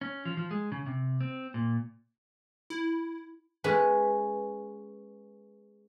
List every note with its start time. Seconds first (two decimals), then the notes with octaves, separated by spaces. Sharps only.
0.01 C#4
0.25 F3
0.37 F3
0.51 G#3
0.72 C#3
0.86 C3
1.21 C4
1.54 A#2
2.70 E4
3.64 G#3 B3 C#4 B4